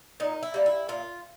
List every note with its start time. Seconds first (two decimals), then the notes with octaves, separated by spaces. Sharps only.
0.20 A#2 D#4
0.43 E4
0.54 G3 A#3
0.66 E4
0.89 A#2 F4